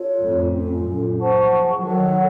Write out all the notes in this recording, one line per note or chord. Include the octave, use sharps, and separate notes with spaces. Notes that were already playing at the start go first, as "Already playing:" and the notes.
Already playing: F4 A4 C#5
F2 A2
C#4 F4 A4
F#2 A#2
C5 F#5 A5 C#6
C#3 F3
D#3 F#3 D#4 A4 C#5 F#5